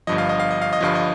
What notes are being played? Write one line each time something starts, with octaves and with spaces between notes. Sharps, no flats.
G1 G2 F3 D#5
F5
D#5
F5
D#5
F5
D#5
G1 G2 F3 F5
D#5